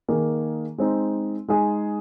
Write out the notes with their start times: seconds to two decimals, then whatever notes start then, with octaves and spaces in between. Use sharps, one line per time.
0.08 D#3 A#3 G#4
0.78 G#3 C4 D#4
1.48 G#3 D#4 G#4